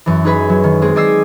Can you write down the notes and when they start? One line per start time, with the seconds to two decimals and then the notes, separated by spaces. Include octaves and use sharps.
0.06 F#2 E3
0.24 D#4 G#4 B4 G#5 B5
0.49 F#3
0.64 D#3
0.82 G#3 C4 G#4
0.95 C5 D5 D#5 G#5 E6 C7